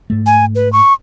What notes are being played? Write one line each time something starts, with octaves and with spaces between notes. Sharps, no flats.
G#2 A3
G#5
B4
C#6